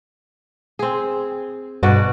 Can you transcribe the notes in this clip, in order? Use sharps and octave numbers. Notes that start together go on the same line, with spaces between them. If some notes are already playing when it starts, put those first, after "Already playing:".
C4 G#4
G2 B2 F#4 D5